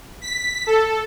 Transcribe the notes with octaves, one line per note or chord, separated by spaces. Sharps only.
B6
A4